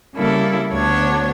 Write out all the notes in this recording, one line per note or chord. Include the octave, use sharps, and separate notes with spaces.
C#3 G3 A#3 E4 A4
D2 B3 D4 C#5 G#6